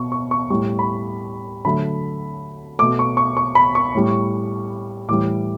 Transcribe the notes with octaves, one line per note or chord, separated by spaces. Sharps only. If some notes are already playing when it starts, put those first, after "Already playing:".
Already playing: B2 C#6
C#6
C#6
A2 G3 C#6
B5
D3 F#3 A3 B5
B2 A3 D6
C#6
C#6
C#6
B5
C#6
A2 G3
A2 E3 G3 D6